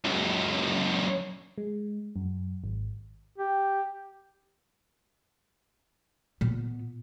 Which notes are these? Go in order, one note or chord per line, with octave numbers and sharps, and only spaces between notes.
C#2 F#2
G#3
F#2
G#1
G4
A#2 B3